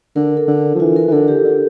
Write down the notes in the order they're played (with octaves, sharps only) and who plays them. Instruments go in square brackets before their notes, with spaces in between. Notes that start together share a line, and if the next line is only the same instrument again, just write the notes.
[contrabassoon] D3 [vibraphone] A#4
[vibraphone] A4
[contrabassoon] D3
F3
[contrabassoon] E3 [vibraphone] F4
[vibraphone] A#4
[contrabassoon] E3
[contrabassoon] D3 [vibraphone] A4
[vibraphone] G4
[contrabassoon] D3